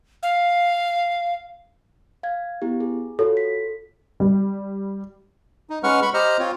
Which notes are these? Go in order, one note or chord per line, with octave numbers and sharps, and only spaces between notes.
F5
F5 G#6
B3 E4 G4
G#4
F4 F#4 A4 C#5
B6
G3
D#4
G#3 C#4 B4 F#5 C#6 F6
B5 C#6
G4 C5 D#5 A#5 F6
C4 F4 C#5